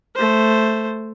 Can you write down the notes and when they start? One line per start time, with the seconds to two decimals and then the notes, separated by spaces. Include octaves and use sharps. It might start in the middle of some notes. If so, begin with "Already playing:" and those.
0.16 A3 C5